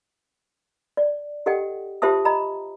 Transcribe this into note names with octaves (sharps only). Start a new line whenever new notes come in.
D5
G4 A4 D#5 F#5 G5
F4 G4 C5 E5 A5 D#6
D#5 A#5 B5